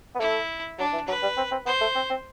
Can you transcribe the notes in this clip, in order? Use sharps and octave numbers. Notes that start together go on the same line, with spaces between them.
B3
A3 E4
F#3 D4
E3
F#3 B4
G3
C4
C4
B3 C5
A3
C4
C4